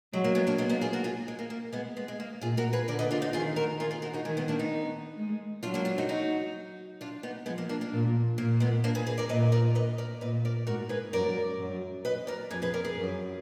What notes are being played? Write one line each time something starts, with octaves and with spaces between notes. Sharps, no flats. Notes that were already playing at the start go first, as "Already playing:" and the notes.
F#3 G#3
A#3
G#3 B3
A#3 D4
G#3 A#3 B3
G#3 B3
F4 G#4
F#4 A#4
F4 G#4
G#3
A#3
A#3
G#3 B3
G#3 B3
G#3
A#3
A#2 F4 G#4
F#4 A#4
G#4 B4
D3 A#4 D5
B4 D#5
D4 F4
D#4 F#4
D#3 F4 G#4
F#4 A#4
F4 G#4
F4 G#4
F#4 A#4
D#4 F#4
D#3 G#3
G#3 B3
A#3 D4
B3 D#4
G#3
F#3 D4 F4
A#3 D4
D4 F4
D#4 F#4
D#4 F#4
D4 F4
B3 D#4
F3 G#3 B3
A#3
A#3 D4
A#3 D4
A#2
A#2 A#3
G#3 B3
A#3 D4
G#4 B4
G#4 B4
A#4 D5
A#2 B4 D#5
A#4 D5
B4 D#5
A#4 D5
A#2 B4 D#5
A#4 D5
G#2 F#4 A#4
G#4 B4
F#2 A#4 D5
F#2
B4 D#5
A#4 D5
F2 G#4 B4
G#4 B4
A#4 D5
G#4 B4
F#2